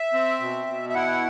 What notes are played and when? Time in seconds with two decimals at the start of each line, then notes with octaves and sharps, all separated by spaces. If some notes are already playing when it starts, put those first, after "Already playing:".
Already playing: E5
0.13 C4
0.40 B2
0.67 B2
0.89 E5
0.95 E4 F#5